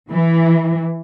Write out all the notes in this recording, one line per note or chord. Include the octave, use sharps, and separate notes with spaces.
E3